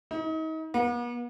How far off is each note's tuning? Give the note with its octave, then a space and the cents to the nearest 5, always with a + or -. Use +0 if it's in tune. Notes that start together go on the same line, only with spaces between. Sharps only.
D#4 +35
B3 -45